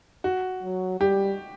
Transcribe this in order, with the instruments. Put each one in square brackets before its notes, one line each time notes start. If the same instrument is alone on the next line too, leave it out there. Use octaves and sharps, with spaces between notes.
[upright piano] F#4
[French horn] F#3
[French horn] G3 [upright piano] G4